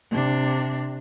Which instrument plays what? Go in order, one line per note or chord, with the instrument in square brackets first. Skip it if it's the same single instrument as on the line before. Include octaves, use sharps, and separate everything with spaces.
[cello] C3 D4